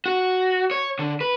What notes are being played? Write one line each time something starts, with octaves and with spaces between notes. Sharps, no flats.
F#4
C#5
D3
B4